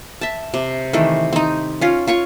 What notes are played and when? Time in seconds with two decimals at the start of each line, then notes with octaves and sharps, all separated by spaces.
0.21 E5 A5
0.54 C3
0.93 D#3 E3 A3
1.33 C4 D#4
1.81 C#4 F4
2.07 F4 C#5 C#6